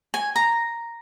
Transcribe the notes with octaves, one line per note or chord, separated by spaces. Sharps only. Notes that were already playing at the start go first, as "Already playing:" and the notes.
G#5
A#5